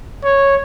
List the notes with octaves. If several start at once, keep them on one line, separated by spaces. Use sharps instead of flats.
C#5